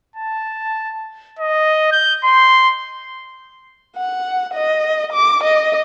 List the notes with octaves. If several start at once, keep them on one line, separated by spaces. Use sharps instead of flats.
A5
D#5
G6
C6
F#5
D#5
D6
D#5